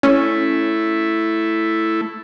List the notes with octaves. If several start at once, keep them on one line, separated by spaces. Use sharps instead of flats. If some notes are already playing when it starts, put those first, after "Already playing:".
A3 C#4 E4